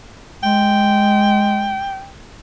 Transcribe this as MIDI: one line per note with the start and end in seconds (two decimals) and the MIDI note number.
0.43 1.82 56
0.43 2.09 79